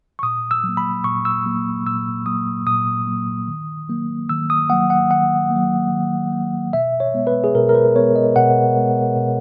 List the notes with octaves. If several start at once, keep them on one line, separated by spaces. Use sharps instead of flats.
C#6
A#2 D#6
E6
F#3
A#3
B5
A#2 C#6
E6
F#3 A#3
A#2 E6
F#3 A#3 D#6
A#2 D#6
F#3 A#3
D#3
F#3 A#3
D#3 E6
D#6
F#3 A#3 F#5
F#5
D#3 F#5
F#3 A#3
D#3
F#3 A#3
B2 E5
C#5
G#3 B3
B4
G#4
B2 A#4
A#4
B4
G#3 B3 C#5
D#5
B2 F#5
G#3 B3
B2